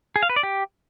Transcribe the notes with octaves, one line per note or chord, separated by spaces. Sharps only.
G#4
F5
B4
D5
G4